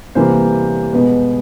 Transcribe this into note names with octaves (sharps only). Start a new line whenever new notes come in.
C3 E3 G3 A#3 C5
B2 G#3 B3 B4